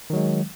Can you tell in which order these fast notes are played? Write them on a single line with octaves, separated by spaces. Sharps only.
D#3 F#3 G#3